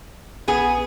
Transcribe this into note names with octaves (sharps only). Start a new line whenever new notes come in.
F1
A#1 B3 G#4